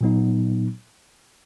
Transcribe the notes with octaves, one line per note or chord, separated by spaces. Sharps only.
A#2 F#3 B3 D#4